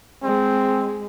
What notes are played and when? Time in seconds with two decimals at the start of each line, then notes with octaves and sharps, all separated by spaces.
0.23 G#3 C4